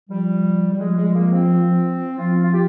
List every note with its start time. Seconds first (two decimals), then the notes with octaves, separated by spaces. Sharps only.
0.10 F3 G3
0.72 G3
0.79 F3 G#3
0.97 G#3
1.14 A#3
1.32 C4
2.18 F3 F4
2.43 F4
2.53 G4